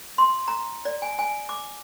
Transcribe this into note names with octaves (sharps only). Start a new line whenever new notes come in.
C6
A#5
D5
G#5
G#5
D6